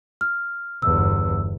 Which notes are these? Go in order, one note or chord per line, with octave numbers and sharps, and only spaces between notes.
F6
G1 E2 E6